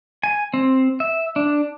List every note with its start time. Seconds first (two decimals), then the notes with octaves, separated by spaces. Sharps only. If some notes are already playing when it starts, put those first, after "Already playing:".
0.23 G#5
0.54 C4
1.00 E5
1.36 D4